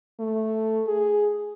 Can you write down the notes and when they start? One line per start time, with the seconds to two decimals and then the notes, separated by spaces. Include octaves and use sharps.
0.20 A3
0.87 G#4